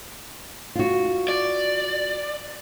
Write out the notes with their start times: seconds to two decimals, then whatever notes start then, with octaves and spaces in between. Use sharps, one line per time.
0.75 F4 F#4
1.28 D5